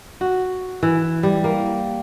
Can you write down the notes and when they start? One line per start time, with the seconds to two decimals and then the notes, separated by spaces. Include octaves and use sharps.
0.21 F#4
0.83 E3
1.23 G3
1.44 A#3